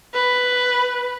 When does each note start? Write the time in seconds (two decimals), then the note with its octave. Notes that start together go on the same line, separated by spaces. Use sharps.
0.14 B4